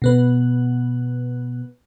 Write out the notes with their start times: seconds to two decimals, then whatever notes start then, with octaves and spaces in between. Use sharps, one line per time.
0.02 B2 B3 B4